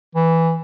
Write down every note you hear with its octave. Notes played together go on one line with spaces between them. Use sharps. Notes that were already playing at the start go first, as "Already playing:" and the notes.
E3